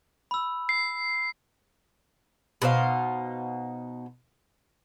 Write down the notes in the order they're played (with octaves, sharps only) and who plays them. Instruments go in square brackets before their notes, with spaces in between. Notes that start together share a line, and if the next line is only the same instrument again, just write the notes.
[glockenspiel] B5 E6
[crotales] C7
[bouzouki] B2 D#4 C5 F5